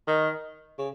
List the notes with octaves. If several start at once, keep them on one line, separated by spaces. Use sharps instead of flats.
D#3
C#3